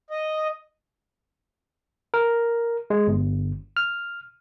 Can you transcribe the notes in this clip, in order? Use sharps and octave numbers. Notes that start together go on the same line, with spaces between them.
D#5
A#4
G#3
G1
F6